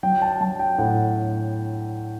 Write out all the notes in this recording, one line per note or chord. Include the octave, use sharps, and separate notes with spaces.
F#3 G5
A5
F#3 A5
G5
A2 F#5